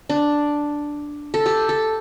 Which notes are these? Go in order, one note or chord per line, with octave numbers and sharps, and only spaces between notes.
D4
A4
G4
A4